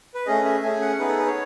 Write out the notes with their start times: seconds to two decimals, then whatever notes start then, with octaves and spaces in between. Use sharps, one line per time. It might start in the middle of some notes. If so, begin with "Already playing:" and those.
0.14 B4
0.26 A3 C#4 G#4 D#5
0.45 E5
0.63 A3 C#4 G#4 G#5
0.81 F#5
0.99 B3 D#4 G#4 B4
1.08 A4
1.18 B4
1.27 C#5